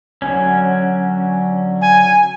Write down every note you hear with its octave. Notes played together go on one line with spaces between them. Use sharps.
D3 F#3 C#4
G#5